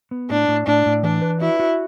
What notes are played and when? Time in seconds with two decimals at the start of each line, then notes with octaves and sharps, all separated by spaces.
0.11 B3
0.30 A2 D4
0.48 A2
0.67 A2 D4
0.86 A2
1.03 E3 D4
1.22 B4
1.40 E4 F#4
1.60 F#4